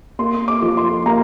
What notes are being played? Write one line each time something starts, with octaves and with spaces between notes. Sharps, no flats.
A#3 C6
D6
F3
C6
A#3 A#5